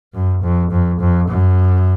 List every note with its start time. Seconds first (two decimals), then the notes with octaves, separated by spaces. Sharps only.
0.14 F#2
0.43 F2
0.71 F2
1.00 F2
1.29 F#2